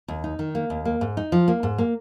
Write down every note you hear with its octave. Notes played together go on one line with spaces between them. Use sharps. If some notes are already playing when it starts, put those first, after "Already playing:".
D#2
D#4
D#3
A#3
D#2
A#3
G#2
D#4
F3
A#3
G#2
A#3